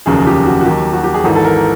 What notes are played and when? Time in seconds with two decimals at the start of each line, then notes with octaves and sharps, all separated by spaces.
0.06 F1 D#2 C#3 F#3 G#4
0.27 G4
0.46 F#4
0.61 F#4
0.65 D#2 D#3 F#3 G4
0.93 F#4
1.04 G4
1.14 G#4
1.24 G#1 G#2 E3 A4
1.36 A4
1.44 A#4